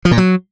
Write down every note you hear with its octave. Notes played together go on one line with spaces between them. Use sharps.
F3
A#2
F#3